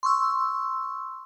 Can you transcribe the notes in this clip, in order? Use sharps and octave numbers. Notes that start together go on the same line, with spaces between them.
C6 C#6 E6